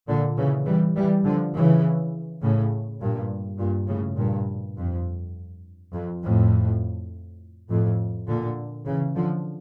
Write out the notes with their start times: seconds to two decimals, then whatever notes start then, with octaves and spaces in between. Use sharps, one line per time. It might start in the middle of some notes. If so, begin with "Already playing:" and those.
0.08 A#2 D3
0.37 C#3 E3
0.67 E3 G3
0.96 E3 G3
1.25 D3 F3
1.55 C#3 E3
2.42 A2 C#3
3.01 G2 A#2
3.59 G2 A#2
3.89 A2 C#3
4.17 G2 A#2
4.77 F2
5.93 F2
6.23 F2 A2
7.69 F2 A2
8.27 A#2 D3
8.86 C#3 E3
9.15 D3 F3